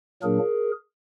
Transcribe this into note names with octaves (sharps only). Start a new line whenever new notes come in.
A#2 F#3 A#3 D4 G#4 A#4